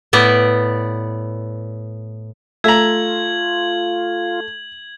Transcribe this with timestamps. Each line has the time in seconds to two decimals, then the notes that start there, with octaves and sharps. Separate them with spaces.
0.13 A2 B3 D5
2.64 A3 F4 E5 A#5 G#6 F#7